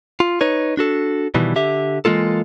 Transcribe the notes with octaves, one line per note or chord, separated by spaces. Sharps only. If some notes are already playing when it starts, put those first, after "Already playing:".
F4
D#4 B4 C#5
D4 F#4 A4
B2 D#3 E3 G3
D3 G4 E5
E3 G#3 A#3 F4 A4